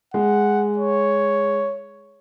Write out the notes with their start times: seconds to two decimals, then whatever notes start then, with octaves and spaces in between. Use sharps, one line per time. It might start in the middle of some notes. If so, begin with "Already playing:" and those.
0.14 G#3 F#5
0.78 C#5